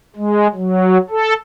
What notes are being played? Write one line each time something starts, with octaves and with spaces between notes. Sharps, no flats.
G#3
F#3
A4